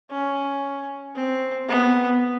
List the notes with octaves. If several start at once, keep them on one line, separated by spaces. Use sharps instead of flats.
C#4
C4
B3